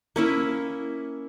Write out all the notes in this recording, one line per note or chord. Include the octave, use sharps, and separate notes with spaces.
A#3 C#4 E4